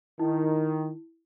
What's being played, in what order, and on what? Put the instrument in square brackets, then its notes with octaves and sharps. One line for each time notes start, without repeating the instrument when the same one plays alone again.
[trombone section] D#3 [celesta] E4